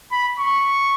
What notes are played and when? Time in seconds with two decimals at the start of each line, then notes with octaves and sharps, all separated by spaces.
0.12 B5
0.40 C#6